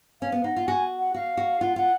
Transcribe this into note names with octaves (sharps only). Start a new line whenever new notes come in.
C#4 F5
B3
D#4 F#5
F4
F#4 G#5
F#5
F#4 F5
F#4
F4 F#5
F4 F#5